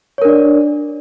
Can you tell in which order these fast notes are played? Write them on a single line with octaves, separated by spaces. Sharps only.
C#5 A#4 D4 D5